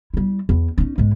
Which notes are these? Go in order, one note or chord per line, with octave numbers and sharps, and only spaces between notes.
G3 E4
E2
C#4 D#4
G#2 G#3